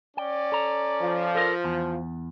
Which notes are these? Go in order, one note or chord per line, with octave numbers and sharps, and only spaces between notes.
C#4 D5 G5
A4 A#5
F3
A4 A#4
E2